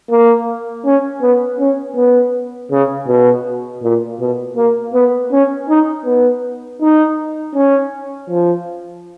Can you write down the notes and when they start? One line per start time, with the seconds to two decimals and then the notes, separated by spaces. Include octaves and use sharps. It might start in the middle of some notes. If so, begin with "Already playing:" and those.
0.10 A#3
0.86 C#4
1.22 B3
1.60 C#4
1.96 B3
2.72 C#3
3.08 B2
3.83 A#2
4.20 B2
4.57 A#3
4.94 B3
5.32 C#4
5.69 D#4
6.05 B3
6.81 D#4
7.55 C#4
8.29 F3